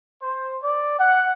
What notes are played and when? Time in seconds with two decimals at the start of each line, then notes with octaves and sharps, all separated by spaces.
0.22 C5
0.62 D5
0.99 F#5